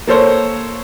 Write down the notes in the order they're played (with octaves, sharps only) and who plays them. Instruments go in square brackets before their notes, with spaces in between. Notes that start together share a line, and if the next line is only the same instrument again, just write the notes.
[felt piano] A#3 A4 C5 C#5